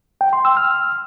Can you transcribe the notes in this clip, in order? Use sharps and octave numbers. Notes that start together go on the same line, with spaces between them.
G5
C6
E6
F6